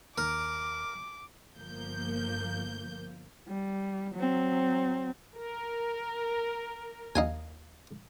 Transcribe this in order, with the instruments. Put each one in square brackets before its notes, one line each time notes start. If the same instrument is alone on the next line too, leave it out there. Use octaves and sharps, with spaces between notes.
[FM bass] D#2 [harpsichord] A#4 [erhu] D6
[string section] G1 F3 A#3 G6
[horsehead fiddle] G3
F#3 C4
[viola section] A#4
[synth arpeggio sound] D#2 [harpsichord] D#4 F5 G#5